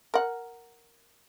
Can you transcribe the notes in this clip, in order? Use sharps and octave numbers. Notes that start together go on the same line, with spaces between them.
A#4 F#5